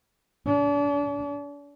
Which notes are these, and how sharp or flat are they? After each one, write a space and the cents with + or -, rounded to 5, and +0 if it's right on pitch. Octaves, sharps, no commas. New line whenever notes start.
D4 -40